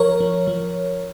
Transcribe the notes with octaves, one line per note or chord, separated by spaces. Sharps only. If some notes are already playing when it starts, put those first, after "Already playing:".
Already playing: F3 A#4 C#5
F3
F3